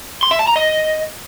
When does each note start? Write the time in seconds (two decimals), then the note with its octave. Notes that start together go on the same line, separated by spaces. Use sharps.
0.23 C6
0.31 E5
0.39 A5
0.47 A#5
0.56 D#5